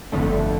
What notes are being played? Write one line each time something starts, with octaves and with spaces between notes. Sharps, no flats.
G1 F2 D3 A3